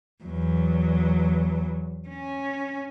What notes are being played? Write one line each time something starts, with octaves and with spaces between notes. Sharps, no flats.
E2 F#3
C#4